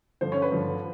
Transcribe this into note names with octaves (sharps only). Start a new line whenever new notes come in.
G2 D3 F3 C5
C#4 C#5
B4
G2 D3 F3